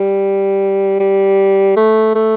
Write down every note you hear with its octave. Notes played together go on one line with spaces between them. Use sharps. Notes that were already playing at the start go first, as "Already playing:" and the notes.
Already playing: G3
G3
A3
A3